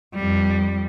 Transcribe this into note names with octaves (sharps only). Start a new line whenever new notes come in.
F2 G3